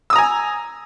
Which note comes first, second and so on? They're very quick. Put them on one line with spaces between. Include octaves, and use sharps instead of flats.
E6 D#6 A#5 G#5